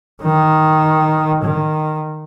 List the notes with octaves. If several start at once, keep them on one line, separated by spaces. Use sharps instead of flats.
D#3
D#3